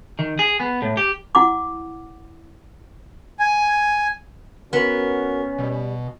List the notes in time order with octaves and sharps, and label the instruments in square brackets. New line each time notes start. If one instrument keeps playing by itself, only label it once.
[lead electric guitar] D#3
G#4
B3
A2
G4
[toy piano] E4 F#5 D6
[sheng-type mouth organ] G#5
[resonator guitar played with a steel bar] B3 [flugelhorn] C#4 [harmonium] F#4 A#4
[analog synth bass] B2 [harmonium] G3